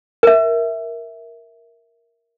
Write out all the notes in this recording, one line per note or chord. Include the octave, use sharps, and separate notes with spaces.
A#4 E5